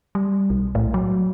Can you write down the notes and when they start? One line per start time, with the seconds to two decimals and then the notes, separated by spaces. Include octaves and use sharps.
0.15 G3
0.50 B1
0.75 A2
0.94 F#3